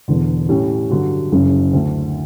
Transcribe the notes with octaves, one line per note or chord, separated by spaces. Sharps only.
E1 E2 D3
A2 G3 C#4
G2 D3 F#3
F#1 F#2 C#3
D2 D3 A3